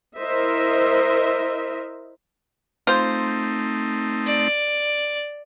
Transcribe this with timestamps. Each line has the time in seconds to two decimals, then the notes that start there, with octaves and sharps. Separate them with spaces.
0.17 E4 A#4 C5 D#5 E5
2.87 A3 C4 D#4 F4 C5
4.26 D5